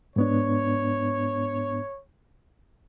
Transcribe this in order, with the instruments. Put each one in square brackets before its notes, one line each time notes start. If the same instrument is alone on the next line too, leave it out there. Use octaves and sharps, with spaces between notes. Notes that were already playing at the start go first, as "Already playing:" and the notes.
[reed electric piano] G#2 B3 D4 [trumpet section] C#5